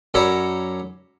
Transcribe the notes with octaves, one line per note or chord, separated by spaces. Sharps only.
F#2 A4 C#5 D5 A#5 B5